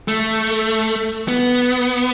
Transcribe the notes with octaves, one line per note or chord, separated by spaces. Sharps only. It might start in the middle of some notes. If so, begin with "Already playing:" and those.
A3
B3